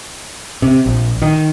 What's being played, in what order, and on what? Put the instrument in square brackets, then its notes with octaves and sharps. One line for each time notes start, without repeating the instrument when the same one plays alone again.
[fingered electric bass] C3
A#1
D#3